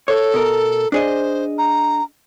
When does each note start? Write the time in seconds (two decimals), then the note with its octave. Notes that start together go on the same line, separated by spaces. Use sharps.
0.08 A4 C#5
0.34 B2 A#4
0.92 D4 G#4 C5 D#5
1.58 A#5